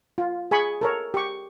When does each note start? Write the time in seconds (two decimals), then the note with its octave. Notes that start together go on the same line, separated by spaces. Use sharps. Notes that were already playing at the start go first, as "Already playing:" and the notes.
0.18 F4
0.51 G#4 G#5 B5 C#6
0.81 A4 A#4 C#5
1.14 G4 C#6